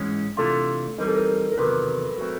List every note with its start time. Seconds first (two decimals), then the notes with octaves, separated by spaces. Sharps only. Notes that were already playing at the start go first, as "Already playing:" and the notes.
Already playing: G#2 E3 G#3 C#4
0.37 C3 E3 A3 D4 F4 A4
0.98 E3 G3 C4 D#4 A#4
1.07 A4
1.14 A#4
1.52 A#4
1.57 E2 C3 D#3 F#3 B4
2.18 F#3 A3 C4